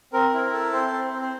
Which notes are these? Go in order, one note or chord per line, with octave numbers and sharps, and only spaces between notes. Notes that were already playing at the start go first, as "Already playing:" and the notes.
C4 A#4
E4
A4
C4 C5
C4
C4
C5